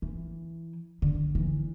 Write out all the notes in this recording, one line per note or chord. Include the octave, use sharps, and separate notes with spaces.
E3
D3
E3